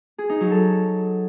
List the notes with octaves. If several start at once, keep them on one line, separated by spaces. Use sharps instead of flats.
G#4
D#4
F#3
A4